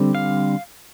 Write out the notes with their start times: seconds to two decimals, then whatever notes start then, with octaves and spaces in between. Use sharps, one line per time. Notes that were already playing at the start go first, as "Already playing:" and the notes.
Already playing: D3 G3 C4
0.15 F5